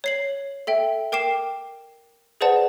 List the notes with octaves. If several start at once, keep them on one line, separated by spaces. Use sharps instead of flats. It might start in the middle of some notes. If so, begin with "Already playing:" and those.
C#5 C7 F#7
A4 E5 G5
A#4 G5 D6 C7 E7
G#4 B4 C5 D5 F#5 A5